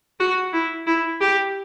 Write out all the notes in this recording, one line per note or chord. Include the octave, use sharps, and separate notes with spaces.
F#4
E4
E4
G4